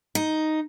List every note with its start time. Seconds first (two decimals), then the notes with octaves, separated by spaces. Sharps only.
0.15 D#4